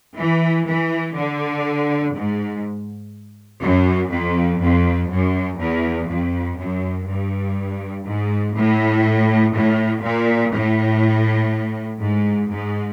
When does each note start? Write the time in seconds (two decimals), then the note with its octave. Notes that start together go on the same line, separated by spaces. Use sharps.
0.17 E3
0.66 E3
1.15 D3
2.14 G#2
3.62 F#2
4.11 F2
4.61 F2
5.10 F#2
5.59 E2
6.08 F2
6.58 F#2
7.07 G2
8.05 G#2
8.55 A2
9.54 A2
10.02 A#2
10.52 A2
12.00 G#2
12.49 G#2